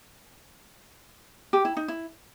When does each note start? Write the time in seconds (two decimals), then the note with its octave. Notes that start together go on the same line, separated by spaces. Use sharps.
1.53 G4
1.65 E4
1.77 D#4
1.88 E4